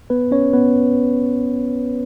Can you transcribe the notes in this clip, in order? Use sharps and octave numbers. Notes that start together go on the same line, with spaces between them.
B3 B4
C#4 C#5
B3 B4